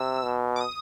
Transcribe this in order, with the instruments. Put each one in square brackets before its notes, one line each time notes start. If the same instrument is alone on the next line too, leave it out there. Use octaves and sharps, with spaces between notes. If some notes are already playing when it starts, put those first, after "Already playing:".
Already playing: [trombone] C3 [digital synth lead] E6
[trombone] B2
[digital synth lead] D6
D#6